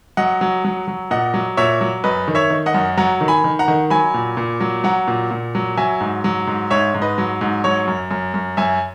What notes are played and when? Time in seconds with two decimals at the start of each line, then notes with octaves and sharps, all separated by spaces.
0.17 F#3 D#5 F#5
0.41 F#3
0.65 F#3
0.88 F#3
1.11 A#2 D#5 F#5
1.34 F#3
1.57 A#2 C#5 E5
1.81 F#3
2.04 F#2 B4 D#5
2.28 D#3
2.35 C#5 E5
2.50 D#3
2.66 D#5 F#5
2.74 F#2
2.97 F#3 F#5 A#5
3.21 D#3
3.28 G#5 B5
3.44 D#3
3.59 F#5 A#5
3.68 D#3
3.90 F#3 G#5 B5
4.14 A#2
4.37 A#2
4.60 F#3
4.84 F#3 F#5 A#5
5.07 A#2
5.31 A#2
5.55 F#3
5.77 F#3 E5 G#5
6.00 G#2
6.24 F#3
6.47 G#2
6.70 G#2 C#5 E5
6.94 G#2
7.02 B4 D#5
7.18 F#3
7.41 G#2
7.64 F#3 C#5
7.87 F#2
8.11 F#2
8.34 F#2
8.57 F#2 E5 G#5